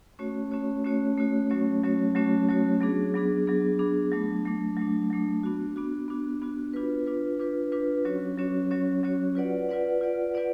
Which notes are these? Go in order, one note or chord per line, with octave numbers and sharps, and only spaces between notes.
A3 C#4 F#4 C#5
A3 C#4 F#4 C#5
A3 C#4 F#4 C#5
A3 C#4 F#4 C#5
F#3 A3 C#4 F#4 C#5
F#3 A3 C#4 F#4 C#5
F#3 A3 C#4 F#4 C#5
F#3 A3 C#4 F#4 C#5
F#3 B3 D4 G#4
F#3 B3 D4 G#4
F#3 B3 D4 G#4
F#3 B3 D4 G#4
F#3 A3 D4
F#3 A3 D4
F#3 A3 D4
F#3 A3 D4
B3 D4 F#4
B3 D4 F#4
B3 D4 F#4
B3 D4 F#4
D4 F4 B4
D4 F4 B4
D4 F4 B4
D4 F4 B4
F#3 C#4 F#4 C#5
F#3 C#4 F#4 C#5
F#3 C#4 F#4 C#5
F#3 C#4 F#4 C#5
F4 B4 D5 F#5
F4 B4 D5 F#5
F4 B4 D5 F#5
F4 B4 D5 F#5